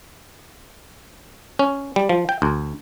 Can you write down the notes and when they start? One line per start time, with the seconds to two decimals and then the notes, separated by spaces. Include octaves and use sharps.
1.59 C#4
1.96 G3
2.09 F3
2.29 G5
2.42 D2